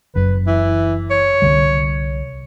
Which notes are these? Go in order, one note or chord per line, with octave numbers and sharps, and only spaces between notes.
F#1 F#2 B4
E3
C#5
C2 D3 G3